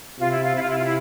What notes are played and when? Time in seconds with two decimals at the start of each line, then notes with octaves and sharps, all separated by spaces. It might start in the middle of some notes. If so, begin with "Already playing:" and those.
0.19 C3 F4
0.30 E4
0.43 F4
0.56 C3 E4
0.62 F4
0.70 E4
0.77 F4
0.84 E4